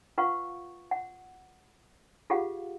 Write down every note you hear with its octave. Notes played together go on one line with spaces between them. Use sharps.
F4 B4 F5 F#5 C#6
F#5
F4 G4 G#4 F5 F#5